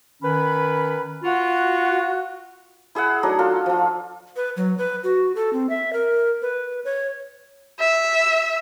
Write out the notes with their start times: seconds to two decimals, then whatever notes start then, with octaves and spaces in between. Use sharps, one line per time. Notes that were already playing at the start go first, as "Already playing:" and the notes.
0.22 D#3 C#4 B4 B5
1.23 F4 F#4
2.95 E4 G#4 E5 F#5
3.23 F#3 A3 D4 D#4
3.39 F4 A4
3.66 F3 F4
4.36 B4
4.57 F#3
4.78 B4
5.04 F#4
5.36 A4
5.53 C4
5.70 E5
5.93 A#4
6.42 B4
6.85 C#5
7.80 E5